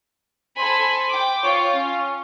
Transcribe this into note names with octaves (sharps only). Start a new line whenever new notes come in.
A4 C5 G#5 B5
G5 D6
F4 C#5
C#4